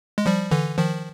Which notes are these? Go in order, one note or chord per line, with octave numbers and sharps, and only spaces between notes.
G#3
F3 G3
D3 E3
D#3 F3